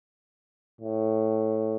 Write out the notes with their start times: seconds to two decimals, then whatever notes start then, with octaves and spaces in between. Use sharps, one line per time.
0.81 A2